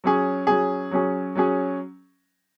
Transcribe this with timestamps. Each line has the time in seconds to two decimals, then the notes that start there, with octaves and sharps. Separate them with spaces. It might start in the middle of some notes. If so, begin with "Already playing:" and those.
0.04 F#3 C#4 G#4
0.47 F#3 C#4 G#4
0.91 F#3 C#4 G#4
1.35 F#3 C#4 G#4